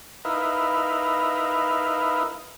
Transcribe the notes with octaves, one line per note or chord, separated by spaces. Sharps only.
D#4 E4 A#4 B4 F5